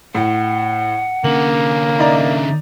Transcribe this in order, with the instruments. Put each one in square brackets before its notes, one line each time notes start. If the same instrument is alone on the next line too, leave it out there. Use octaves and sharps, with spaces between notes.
[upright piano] A2 [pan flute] F#5
[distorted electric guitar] D3 C#4 [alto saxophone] A#3 [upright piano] F#7
[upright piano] D#4 D5 A#5 [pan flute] E5